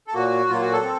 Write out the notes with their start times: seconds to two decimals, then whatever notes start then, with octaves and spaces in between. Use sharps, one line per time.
0.07 A4
0.13 A#2 F#3 A#3 F#4
0.49 A#2 F#3 A#3 F4
0.61 F#4
0.72 A4
0.83 C4